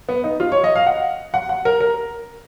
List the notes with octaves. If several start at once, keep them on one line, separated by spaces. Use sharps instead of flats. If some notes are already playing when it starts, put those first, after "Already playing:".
B3
D#4
F4
C#5
D#5
F5
F#5
F#5
F#5
A#4
A#4